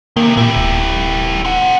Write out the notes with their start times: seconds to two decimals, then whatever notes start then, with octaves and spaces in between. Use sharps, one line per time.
0.17 C3 D#3 A#3
0.37 A#2 E4 G4
0.56 D1
1.45 C4 F#5